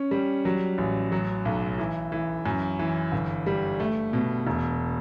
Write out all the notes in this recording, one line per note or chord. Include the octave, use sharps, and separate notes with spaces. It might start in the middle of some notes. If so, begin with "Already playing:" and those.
Already playing: C#4
G3
F#3
A1
F#3
B1
E3
E3
F#2
E3
G1
G3
A3
B2
E1